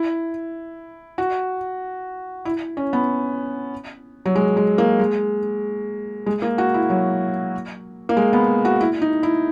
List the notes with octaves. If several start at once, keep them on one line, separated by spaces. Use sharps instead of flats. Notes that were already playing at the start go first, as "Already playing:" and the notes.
Already playing: E4
F#4
E4
C#4
B3
F#3
G#3
G#3
A#3
G#3
G#3
A#3
F#4
E4
F#3
A#3
G#3
B3
F#4
E4
D#4
E4